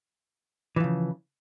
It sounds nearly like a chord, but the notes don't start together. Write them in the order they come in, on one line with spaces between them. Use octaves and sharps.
E3 F3 C#3